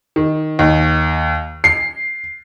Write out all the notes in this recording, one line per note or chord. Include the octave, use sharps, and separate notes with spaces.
D#3
D#2
C7